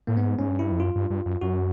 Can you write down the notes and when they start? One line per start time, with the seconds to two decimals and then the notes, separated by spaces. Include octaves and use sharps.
0.07 A2 A#3
0.17 G#2 B3
0.39 G#2 C#4
0.48 G2
0.59 E4
0.72 F2
0.79 F#2 F4
0.95 G2
1.10 G2
1.26 F#2
1.41 F#2 F#4